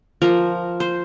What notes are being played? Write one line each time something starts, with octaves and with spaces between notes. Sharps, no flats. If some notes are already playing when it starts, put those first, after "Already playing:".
F3 A#4
C5